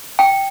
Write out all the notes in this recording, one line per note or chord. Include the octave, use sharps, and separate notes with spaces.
G5